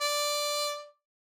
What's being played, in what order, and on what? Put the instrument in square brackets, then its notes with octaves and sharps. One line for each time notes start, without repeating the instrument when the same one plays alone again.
[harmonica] D5